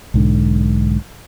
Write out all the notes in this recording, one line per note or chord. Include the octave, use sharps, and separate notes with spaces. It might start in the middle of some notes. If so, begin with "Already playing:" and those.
B1 G#2 D3